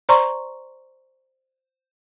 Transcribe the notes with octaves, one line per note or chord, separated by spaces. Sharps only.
C5 D5 A#5 C6 C#6